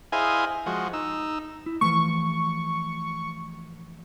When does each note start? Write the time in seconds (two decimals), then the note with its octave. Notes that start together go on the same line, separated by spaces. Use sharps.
0.12 E4 G#4 C5 D#5 F5 G#5
0.66 F3 G#3 F#4
0.93 D#4 E6
1.66 E4
1.81 E3 F3 A3 C#6